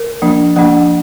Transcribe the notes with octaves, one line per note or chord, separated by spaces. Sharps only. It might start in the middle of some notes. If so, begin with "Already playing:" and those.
Already playing: A#4
F3 A#3 D4
F3 A#3 D4 F#5